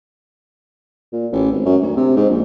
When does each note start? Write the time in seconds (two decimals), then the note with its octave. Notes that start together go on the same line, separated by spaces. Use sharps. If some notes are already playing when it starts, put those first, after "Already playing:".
1.12 A#2
1.32 A1
1.52 G#1
1.65 F#2
1.82 D2
1.96 C3
2.16 G#2
2.29 A#1